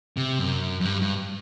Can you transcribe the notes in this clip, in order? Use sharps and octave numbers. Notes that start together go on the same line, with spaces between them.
C3
F#2
F#2
G2
G2